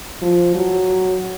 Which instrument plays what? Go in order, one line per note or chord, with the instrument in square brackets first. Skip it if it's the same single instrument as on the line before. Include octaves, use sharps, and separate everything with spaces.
[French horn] F3
F#3